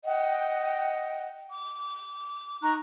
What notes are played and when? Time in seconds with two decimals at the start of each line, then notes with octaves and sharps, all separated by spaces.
0.05 D#5 F#5 G5
1.51 D6
2.62 D#4 A#5 C#6 F#6